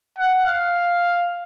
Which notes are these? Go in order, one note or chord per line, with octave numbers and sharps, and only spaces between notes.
F#5
F5